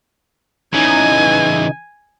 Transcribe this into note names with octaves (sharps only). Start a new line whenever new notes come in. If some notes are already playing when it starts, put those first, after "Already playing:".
C#3 E3 D#4 G#5